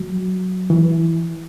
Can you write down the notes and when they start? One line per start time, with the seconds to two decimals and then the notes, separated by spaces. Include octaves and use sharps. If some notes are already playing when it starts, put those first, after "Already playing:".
Already playing: F#3
0.70 E3